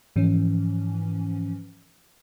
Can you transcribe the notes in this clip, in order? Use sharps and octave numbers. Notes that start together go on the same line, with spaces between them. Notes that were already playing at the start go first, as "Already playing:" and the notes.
G#2 E3 F3 C#4